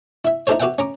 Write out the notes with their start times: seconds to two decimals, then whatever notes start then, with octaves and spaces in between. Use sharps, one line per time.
0.25 E4 E5
0.47 D#4 E4 G4 A4 C5 C#5
0.60 F#4 G4 B4 E5 F#5 G5
0.78 C#4 A#5 D6